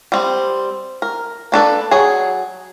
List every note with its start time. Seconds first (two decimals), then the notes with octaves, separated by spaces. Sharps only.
0.12 G3 C4
1.02 A#4
1.52 A#3 D4 A4 B4
1.91 F#3 G#4